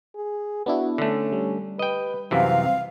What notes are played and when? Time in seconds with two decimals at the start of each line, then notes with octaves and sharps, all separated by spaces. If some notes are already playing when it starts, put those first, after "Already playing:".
0.15 G#4
0.66 B3 D4 E4 F#4
0.98 D3 A3 C#4
1.32 G3
1.79 B4 D#5 G5
2.31 F#2 C3 E3 C4 F5